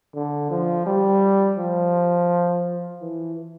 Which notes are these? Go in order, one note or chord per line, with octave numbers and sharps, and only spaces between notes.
D3
F3
G3
F3
E3